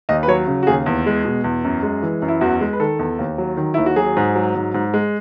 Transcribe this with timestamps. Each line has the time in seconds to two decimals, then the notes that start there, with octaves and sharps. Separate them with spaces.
0.09 D#2 D#5
0.23 B4
0.28 F#3 C#5
0.47 C#3
0.63 F#4
0.67 D#2 G#4
0.86 E2
1.06 G#3
1.25 B2
1.44 E2
1.65 F#2
1.83 G#3
2.03 E3
2.22 F#2
2.28 E4
2.41 E2 F#4
2.61 G#3
2.73 B4
2.80 D#3 A4
2.99 E2
3.19 D#2
3.38 F#3
3.57 D#3
3.74 D#2 E4
3.86 F#4
3.96 F#3 G#4
4.17 G#2
4.36 F#3
4.55 G#2
4.74 G#2
4.94 G#3